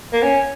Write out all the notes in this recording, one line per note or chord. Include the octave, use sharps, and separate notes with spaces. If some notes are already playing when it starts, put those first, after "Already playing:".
A#3
C#4